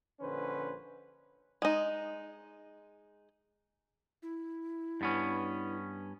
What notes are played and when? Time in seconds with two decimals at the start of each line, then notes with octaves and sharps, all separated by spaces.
0.21 A#1 D3 C#4 B4 C5
1.62 G#3 D#4
4.23 E4
5.01 G2 B3 C#4